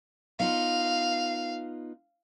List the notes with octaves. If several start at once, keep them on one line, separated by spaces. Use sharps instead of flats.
B3 D#4 F4 F5